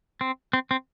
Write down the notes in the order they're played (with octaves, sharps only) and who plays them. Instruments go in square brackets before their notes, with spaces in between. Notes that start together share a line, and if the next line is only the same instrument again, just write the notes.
[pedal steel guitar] C4
C4
C4